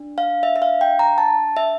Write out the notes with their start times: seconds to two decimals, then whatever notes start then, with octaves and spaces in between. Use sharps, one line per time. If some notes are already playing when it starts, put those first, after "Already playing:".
Already playing: D4
0.18 F5
0.43 E5
0.56 E5
0.62 F5
0.81 G5
0.99 A#5
1.18 A5
1.57 E5